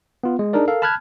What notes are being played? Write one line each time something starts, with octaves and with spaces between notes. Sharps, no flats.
B3 F4
G#3
D4 D#4 G#4 A#4 D5
A4 A#4 F5
A5 B5 F6 F#6 G#6